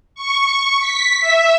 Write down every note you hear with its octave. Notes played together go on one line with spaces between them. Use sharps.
C#6
B6
E5